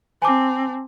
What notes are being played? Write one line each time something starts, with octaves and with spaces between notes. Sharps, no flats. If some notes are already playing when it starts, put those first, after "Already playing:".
C4 G#5 A5 D6